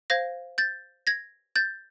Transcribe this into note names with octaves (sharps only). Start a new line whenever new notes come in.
C5 F5 G#6 A#6
G6 A6
G#6 A#6
G6 A6